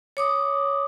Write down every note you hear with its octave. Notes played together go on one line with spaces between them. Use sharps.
C#5 D6 D#6